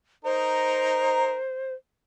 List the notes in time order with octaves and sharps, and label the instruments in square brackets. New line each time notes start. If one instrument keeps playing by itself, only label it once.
[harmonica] D#4 A#4 [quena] C5